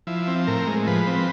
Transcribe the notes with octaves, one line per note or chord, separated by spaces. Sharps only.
F3 E4
C4
A2 A#4
G#3
F3 B4
C4